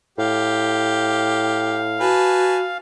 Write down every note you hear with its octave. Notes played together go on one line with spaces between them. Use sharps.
A2 G4 F5
F#4 B4 G#5 A5